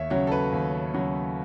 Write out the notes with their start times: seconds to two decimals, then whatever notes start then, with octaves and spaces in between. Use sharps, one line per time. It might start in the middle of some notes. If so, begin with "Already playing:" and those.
Already playing: D#2 C#5 E5
0.10 C#3 F#3 C#5
0.27 A4
0.32 B4
0.53 D#2
0.94 C#3 F#3